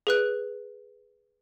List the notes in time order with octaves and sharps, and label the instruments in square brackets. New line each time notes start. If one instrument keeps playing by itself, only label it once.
[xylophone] G#4 B4 F#6